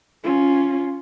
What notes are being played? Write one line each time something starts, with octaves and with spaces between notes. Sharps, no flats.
C#4 F4